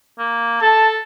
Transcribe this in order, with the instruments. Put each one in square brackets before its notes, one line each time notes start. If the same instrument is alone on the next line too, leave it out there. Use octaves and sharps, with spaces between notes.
[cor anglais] A#3
[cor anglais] A4 [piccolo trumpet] A5